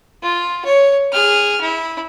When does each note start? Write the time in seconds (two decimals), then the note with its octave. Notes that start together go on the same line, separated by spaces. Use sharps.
0.23 F4
0.65 C#5
1.13 G#4 F6
1.61 E4